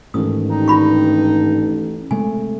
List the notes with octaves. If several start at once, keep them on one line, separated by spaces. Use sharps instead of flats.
A1 G#2 D#3 D#6
G2 D#4
F4 B5 C#6
C3 G#3 A3 G#5